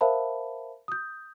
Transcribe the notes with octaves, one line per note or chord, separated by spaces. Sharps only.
A#4 C5 E5 F5 A5 B5
D#6 G6